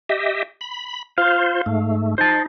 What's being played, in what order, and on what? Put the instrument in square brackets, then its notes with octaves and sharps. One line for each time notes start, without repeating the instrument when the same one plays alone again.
[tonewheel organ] G4 D#5 E5
B5
[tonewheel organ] F4 C5 [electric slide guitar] F5
[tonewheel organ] G#2 A3
[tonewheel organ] D#4 [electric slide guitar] C5 A5